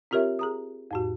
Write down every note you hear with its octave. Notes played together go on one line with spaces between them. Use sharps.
C4 F4 G4 A#4 C#5 E5
G#4 A#5 D#6
F2 A2 F#4